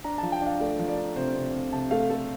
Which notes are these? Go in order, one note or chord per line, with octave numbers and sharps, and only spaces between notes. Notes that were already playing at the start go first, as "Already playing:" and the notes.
D4 A#5
F3 A5
G5
D4 F5
A3 D5
F3
D5
D4
C3 C5
C3
C3
C3 A5
A3 F5
A3 A4